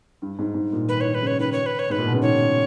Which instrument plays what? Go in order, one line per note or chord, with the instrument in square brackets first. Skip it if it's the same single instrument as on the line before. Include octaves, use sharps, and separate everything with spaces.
[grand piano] G2
G#2
G#2
A#2
[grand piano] D#3 [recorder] B4
[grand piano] D#3 [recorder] C#5
[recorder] B4
[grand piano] C#3
[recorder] C#5
[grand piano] D#3 [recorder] B4
[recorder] C#5
B4
C#5
[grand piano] G#2 [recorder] B4
[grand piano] A#2
B2
C#3
[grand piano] D#3 [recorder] C#5